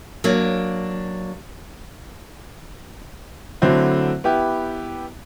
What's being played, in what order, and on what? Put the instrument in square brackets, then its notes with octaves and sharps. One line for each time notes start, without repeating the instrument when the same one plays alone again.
[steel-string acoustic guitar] F#3 A#3 D4
[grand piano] D3 F#3 A3 C4 E4
B3 E4 G4